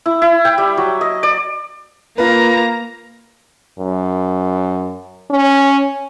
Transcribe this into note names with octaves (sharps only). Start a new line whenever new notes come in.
E4
E4
G5
G3
F#3
D#5
D5
A#3 F4 B4 A#5
F#2
C#4